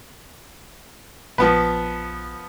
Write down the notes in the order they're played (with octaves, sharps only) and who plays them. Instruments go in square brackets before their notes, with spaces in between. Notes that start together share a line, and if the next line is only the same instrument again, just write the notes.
[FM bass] A#1 [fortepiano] F3 B3 B4